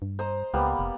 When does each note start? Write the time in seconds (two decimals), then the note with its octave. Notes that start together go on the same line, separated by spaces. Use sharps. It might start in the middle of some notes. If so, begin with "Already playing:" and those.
0.02 G2
0.19 C5 D#5 A#5
0.54 C#2 G3 A#3 B3
0.79 F1